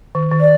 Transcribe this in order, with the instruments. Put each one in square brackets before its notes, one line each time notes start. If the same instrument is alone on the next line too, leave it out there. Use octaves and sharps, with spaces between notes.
[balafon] D#3
D#3
[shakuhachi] D5